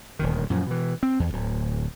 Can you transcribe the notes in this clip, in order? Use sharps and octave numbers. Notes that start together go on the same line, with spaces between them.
D#1 D2 D#3
F#2 A#2 F3
B2 E3
C4
E2
D1 D2